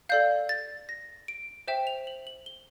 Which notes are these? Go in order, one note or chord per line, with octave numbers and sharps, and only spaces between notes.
A4 D5 F5 G6
A6
A#6
D7
C5 E5 G5 E7
F7
F#7
F#7
G7